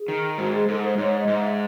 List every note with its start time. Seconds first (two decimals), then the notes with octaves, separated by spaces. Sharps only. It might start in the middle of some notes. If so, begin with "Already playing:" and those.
Already playing: G#4
0.08 D#3
0.38 G#2 F#4
0.53 G#4
0.68 G#2 A4
0.83 C5
0.97 G#2 C#5
1.18 D#5
1.27 G#2
1.37 E5